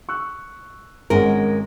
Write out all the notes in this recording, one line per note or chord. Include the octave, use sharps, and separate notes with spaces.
C#6 E6 F#6
G#1 G#3 C#4 A#4 F#5